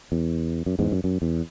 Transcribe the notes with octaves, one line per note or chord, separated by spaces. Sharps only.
E2
F#2
E2 G#2
F#2
F#2
E2